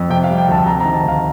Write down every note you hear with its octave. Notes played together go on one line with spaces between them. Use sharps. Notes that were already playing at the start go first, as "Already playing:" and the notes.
Already playing: F2
C3 G5
F5
G3
G5
D2 A5
C3 A#5
A#5
D#3
A5
D2 F5